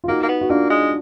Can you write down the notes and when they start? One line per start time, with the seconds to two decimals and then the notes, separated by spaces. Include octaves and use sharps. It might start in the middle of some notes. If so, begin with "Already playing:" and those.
0.04 F4
0.08 A#3 D#4 F#4
0.23 A#3
0.29 B3
0.41 F#4
0.50 A#3 D4 F4
0.70 G#3